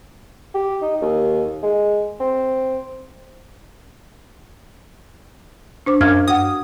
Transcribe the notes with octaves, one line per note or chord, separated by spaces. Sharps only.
G4
D#4
D#2
G#3
C4
D4 C5 D6
F#2 F5 F6 G#6
G2 F#5 D#6